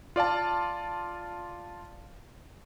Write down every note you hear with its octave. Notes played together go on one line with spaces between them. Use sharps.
F4 D5 F5 A5